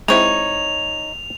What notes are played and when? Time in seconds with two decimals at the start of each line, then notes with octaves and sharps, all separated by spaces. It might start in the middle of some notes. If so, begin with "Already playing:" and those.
0.08 G#3 C4 D#4 E4 C#5 F7